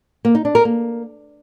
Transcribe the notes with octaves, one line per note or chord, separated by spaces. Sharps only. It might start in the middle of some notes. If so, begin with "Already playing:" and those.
A#3
D#4
D4
A#4
A#3